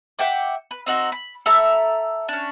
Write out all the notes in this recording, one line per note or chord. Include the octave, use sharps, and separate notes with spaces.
E5 F#5 G5 D6
B4
C4 D#4 F#4
B5
A4 E5 A#5 B5
C#4 D4